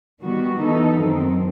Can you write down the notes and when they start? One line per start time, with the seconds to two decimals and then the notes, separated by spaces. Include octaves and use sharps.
0.22 D#3 G3 B3 F#4
0.61 E3 B3 D#4 A4
1.00 F#2 D#3 F#3 C4